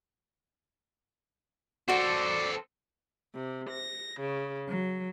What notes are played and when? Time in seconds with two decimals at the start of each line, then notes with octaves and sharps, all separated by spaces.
1.88 F#4 A4 C5 D5
3.34 C3
3.70 A#6
4.21 C#3
4.69 F#3